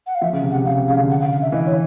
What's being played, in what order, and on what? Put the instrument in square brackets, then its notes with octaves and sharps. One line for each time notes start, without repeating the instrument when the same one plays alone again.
[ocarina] F#5
F5
[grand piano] F3 [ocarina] E5
[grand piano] C#3
C3
[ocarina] F#5
[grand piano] C3
[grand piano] C#3 [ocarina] F5
[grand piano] C3
[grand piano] C#3 [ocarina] F5
[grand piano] D3
[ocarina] F#5
F5
F5
E5
[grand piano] E3 [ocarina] D#5
[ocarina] C#5